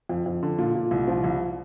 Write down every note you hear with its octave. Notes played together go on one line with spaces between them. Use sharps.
F2
F2
D3
A#2
A#2
C2
F3
C2